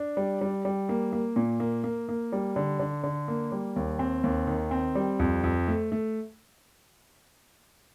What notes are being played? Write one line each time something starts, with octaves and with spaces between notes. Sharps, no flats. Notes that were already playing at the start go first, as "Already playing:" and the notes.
Already playing: D4
G3
G3
G3
A#3
A#3
A#2
A#3
A#3
A#3
G3
D3
D3
D3
A#3
G3
D#2
C4
D#2
D#3
C4
G3
F2
F2
A3
A3